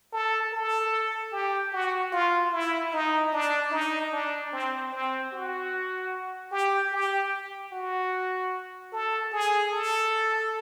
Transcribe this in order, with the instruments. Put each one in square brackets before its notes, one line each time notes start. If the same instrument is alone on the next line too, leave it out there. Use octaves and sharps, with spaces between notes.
[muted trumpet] A4
A4
G4
F#4
F4
E4
D#4
D4
D#4
D4
C4
C4
F#4
G4
G4
F#4
A4
G#4
A4